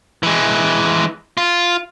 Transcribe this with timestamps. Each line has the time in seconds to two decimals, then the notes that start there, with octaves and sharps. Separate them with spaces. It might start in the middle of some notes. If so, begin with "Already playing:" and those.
0.23 E3 G#3
1.37 F4